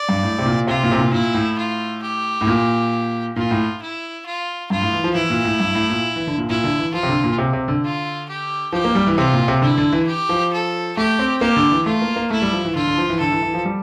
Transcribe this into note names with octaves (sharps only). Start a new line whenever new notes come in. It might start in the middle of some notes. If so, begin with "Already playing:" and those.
Already playing: D5
G2
A2
C3
A#2
C3 F4
A#2
C3
A#2
A#2 E4
A2
F4
G4
A2
A#2
A#2 F4
A2
E4
F4
G2 F4
A2
E3
F3
E3 E4
A#2
A2
G2
A2
A#2
E3
D3
A#2
A#2 E4
D3
E3
F3 F4
C3
D3
A#2
C3
C3
D3
F4
G4
F3 G4
A#3
G3
E3
C3 F4
A#2
C3
D3 E4
D3
E3
G4
F3
A4
A3 G4
C4
A#3 G4
D3
E3
A3 F4
A#3
A#3
A3 E4
G3
F3
E3
D3 F4
D3
F3
E3
D3 A4
E3
E3
F3
G3